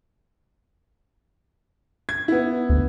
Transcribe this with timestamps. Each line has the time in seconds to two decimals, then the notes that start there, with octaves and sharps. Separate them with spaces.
2.09 G#6
2.28 B3 E4
2.69 D2